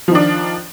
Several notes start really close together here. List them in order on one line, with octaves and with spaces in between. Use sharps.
F3 D#3 D4